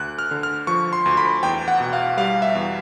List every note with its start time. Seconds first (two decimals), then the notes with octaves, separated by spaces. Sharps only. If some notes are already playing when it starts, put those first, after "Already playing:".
Already playing: D2 F#6
0.19 F6
0.31 D3
0.43 F6
0.67 F3 C#6
0.93 C6
1.06 D2
1.17 B5
1.43 E2 G5
1.68 F#5
1.80 B2
1.93 F5
2.17 G3 F5
2.42 E5
2.55 E2